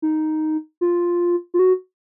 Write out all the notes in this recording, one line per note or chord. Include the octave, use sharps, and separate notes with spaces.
D#4
F4
F4
F#4